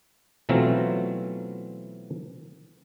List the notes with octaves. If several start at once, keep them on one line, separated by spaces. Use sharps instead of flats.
B2 E3 F#3 A3 C4 F4